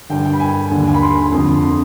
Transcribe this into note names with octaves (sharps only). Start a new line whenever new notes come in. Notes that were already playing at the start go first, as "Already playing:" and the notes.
G2 D3 G5
G5
B5
G#5
D#2 D3
G#5
B5
C6
F2 D3
C6